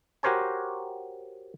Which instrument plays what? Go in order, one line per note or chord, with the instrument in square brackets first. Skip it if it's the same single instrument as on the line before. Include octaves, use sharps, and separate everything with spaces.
[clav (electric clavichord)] F#4 G4 A#4 C5 C#5 G#5